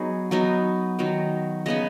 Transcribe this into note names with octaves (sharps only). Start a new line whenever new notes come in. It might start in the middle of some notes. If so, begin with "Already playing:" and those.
Already playing: F#3 B3 D#4 G#4
F#3 B3 D#4
D#3 F#3 D#4
C#3 B3 D#4 D#5